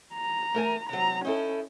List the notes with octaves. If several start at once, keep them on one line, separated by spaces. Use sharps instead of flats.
A#5
A3 A#4 G#5
C3 F#3 A#5
C#4 D#4 E4 A4